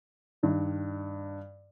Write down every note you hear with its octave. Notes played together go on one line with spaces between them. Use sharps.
G2 D#3